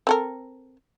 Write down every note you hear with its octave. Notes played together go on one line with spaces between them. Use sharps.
C4 A4 A#4